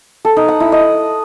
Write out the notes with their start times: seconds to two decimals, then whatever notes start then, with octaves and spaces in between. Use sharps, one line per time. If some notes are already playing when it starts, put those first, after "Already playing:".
0.25 A4
0.37 D#4
0.48 F#5
0.60 E4
0.72 D#5